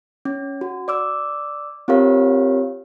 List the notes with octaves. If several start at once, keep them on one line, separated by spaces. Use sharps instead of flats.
C#4
F#4
D5 D6 E6
C4 F4 G4 A#4 C#5 F5